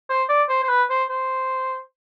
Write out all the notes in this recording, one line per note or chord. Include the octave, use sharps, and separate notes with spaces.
C5
D5
C5
C5
B4
C5
C5